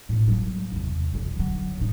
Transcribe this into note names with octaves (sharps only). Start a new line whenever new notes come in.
A2 D4
F#3 A#3
E2 C3
F2 C#3
D3 F#3
A2 D#4